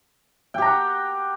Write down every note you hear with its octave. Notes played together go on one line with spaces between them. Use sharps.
G4 F#5 G5 A#5